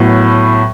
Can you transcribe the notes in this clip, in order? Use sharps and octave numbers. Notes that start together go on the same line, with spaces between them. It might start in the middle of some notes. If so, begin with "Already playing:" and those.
Already playing: A2 F#3 B3